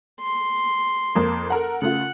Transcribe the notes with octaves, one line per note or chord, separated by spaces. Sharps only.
C6
F2 A#3
A4 A#4 F#5
C#3 A3 F4 F#5